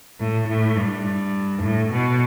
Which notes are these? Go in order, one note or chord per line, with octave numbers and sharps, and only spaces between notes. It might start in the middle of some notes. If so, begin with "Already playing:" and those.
A2
A2
G2
A2
B2